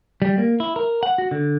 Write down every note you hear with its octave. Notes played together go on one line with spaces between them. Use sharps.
G3
A#3
E4
A#4
F#5
F#4
D3